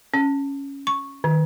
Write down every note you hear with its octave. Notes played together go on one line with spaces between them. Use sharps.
C#4
C#6
D#3